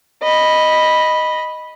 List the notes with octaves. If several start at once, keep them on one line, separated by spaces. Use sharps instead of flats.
D#5 B5